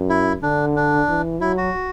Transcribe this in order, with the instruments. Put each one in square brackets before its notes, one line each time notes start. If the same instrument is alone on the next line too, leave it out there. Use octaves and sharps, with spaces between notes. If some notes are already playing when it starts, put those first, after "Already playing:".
Already playing: [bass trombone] F#2
[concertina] E4
[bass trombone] D3 [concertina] D4
[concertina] D4
[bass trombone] E3
[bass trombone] F#3 [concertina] E4
[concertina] F#4